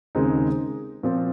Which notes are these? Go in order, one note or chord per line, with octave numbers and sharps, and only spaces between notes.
D#2 C#3 G#3 C4 D#4
A#2 F3 C4